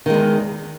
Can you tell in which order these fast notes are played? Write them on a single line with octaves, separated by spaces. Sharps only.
D#3 G#3 E2